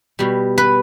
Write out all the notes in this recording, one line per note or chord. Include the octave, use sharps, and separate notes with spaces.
B2 G3
B4